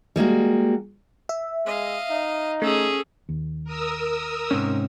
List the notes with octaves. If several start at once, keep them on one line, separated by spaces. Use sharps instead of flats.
G3 G#3 A#3 F#4
E5
G#3 D#5 F5
D#4
A3 C#4 G#4 A4
D#2
A#4 D#6 E6
G#2 C3 C#4